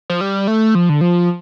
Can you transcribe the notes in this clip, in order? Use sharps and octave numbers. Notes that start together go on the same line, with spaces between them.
F3
G3
A3
F3
D3
F3